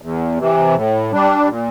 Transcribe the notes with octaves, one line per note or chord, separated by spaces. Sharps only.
E2
C3 E3
A2
G3 D4
A#2